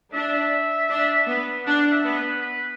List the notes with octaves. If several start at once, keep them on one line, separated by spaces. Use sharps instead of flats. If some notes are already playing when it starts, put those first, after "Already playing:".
D4 E5
D4
B3
D4 F#5
E5
B3
B4
B4